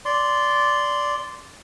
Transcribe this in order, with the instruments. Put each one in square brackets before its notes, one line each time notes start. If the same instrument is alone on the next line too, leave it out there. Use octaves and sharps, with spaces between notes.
[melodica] D5 C6